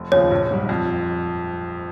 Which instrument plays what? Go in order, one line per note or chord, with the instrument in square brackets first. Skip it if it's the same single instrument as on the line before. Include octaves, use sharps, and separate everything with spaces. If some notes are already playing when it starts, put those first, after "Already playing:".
Already playing: [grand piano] F1
[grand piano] D#2 C#3 F3 [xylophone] C#5
[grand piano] A#1
G#2 G3
F2